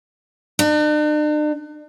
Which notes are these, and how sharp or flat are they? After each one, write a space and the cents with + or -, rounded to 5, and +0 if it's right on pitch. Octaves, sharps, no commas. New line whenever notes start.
D4 +45